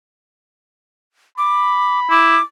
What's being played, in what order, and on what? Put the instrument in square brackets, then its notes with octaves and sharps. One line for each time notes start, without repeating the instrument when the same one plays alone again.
[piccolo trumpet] B5 [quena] D6
[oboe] E4 [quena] D6